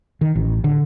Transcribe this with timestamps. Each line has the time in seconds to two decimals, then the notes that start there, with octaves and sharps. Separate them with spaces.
0.21 D#3
0.36 A1
0.64 D3